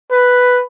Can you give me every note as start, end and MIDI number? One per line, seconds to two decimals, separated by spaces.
0.11 0.63 71